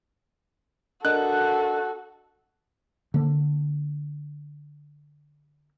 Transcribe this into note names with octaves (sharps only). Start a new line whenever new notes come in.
D4 F#4 A4 A#4 D#5 F#6
D3 A#3